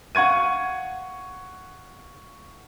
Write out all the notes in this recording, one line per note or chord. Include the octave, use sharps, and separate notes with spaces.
F5 F#5 C#6 G#6 D#7